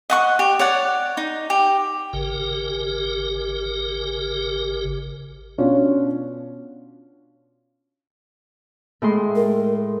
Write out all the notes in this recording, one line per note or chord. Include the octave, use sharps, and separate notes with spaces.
D#5 F#5 C#6
G4
C#5 D5 F#5
D#4
G4
G#1 C#3 G4 A#4
B2 C#4 D4 F4
A2 G#3 C6
A#4